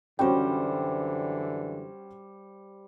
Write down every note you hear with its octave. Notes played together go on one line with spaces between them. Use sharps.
F#2 D3 E3 G3 C#4 F#4 C5 G5